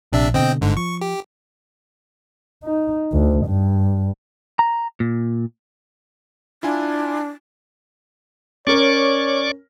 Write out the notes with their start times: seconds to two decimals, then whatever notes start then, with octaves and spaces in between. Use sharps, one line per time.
0.13 A#1 C3 D4 E5
0.34 B2 D3 C4 D#5 G5
0.61 G1 G#2 D3
0.77 F3 C#6
1.01 G4
2.64 D#4
3.12 D2
3.46 G2
4.59 A#5
5.00 A#2
6.63 D4 E4 F4 G#5
8.67 C#4 A#4 C#5 D5 C#6 D6